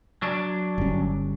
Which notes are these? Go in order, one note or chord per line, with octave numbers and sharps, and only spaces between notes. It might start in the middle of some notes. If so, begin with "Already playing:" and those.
F#3 D4
G1 C#4